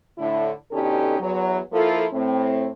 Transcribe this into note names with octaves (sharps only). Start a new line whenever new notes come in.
A2 D3 E4
B2 D3 C#4 D#4 G4 A4
E2 F#3
F3 A#3 E4 F4 A4
A2 C4